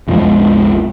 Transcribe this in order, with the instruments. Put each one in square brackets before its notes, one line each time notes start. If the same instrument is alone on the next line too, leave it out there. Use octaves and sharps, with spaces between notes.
[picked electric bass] B1 F2 F3 G#3